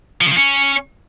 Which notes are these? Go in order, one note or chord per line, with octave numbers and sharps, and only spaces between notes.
F3
C#3
F3
C#4